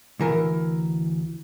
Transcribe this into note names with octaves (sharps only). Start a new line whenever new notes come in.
D2 E3 A#4